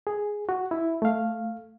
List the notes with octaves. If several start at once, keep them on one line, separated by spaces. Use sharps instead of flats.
G#4
F#4
E4
A3 F5